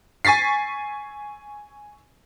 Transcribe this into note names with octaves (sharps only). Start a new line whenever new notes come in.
G#5 C#6 A6 B6 C7